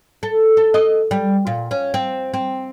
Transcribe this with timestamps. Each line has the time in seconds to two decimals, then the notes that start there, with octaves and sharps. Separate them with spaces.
0.23 A4
0.57 A4
0.74 D#5
1.11 G3
1.47 A#2
1.71 C#4
1.94 C4
2.34 C4